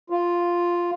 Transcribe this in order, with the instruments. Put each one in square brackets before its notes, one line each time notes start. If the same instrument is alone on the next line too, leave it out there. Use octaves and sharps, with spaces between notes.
[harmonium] F4